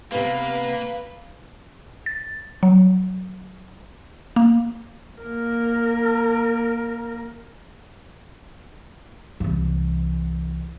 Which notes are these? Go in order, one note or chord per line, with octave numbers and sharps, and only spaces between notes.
C3 A#3 B3 B4 F5
A6
F#3
A#3
A#3 A#4
C2 E3